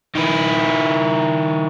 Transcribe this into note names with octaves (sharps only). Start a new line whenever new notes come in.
D#3 E4